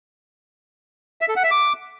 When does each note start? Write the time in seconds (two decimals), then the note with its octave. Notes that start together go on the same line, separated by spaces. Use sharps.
1.21 E5
1.29 A4
1.36 F#5
1.44 E5
1.51 D6